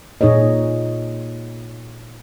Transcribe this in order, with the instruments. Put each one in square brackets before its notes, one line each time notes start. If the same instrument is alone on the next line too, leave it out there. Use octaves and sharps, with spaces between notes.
[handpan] A#2 D#4 G#4 C#5 D#5